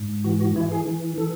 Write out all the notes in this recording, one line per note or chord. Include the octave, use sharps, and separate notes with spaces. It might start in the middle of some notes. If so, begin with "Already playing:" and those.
Already playing: G#2
E3 F#4
F#4
E3 E4
G#4
E3
E3 A4